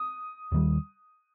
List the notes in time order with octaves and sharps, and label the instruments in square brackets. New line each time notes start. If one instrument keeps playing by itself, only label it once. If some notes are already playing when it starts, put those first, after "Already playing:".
Already playing: [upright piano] D#6
[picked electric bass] D#2 D#3 G3